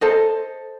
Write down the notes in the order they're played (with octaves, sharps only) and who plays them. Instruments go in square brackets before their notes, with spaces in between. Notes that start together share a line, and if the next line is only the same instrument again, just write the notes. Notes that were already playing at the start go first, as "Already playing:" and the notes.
[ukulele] A4 C5 D#5